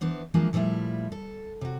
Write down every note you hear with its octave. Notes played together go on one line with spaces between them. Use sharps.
E3 B3 D4 C5
E3 F3 G#3 A#3 D4 F4
A#2 F3 G3 A3 E4
A4
C3 F#4